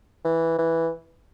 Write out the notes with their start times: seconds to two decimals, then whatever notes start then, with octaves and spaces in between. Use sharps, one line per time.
0.24 E3
0.58 E3